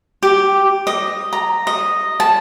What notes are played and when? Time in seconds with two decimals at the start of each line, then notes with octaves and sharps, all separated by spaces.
0.23 G4
0.87 D#5
1.33 A#5
1.67 D#5
2.20 A5